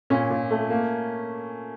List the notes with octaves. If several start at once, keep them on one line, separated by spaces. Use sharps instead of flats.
A#2 C#4
A#2
A3
A#3